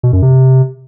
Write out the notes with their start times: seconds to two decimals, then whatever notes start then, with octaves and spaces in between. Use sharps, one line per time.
0.03 B2
0.13 F#2
0.22 C3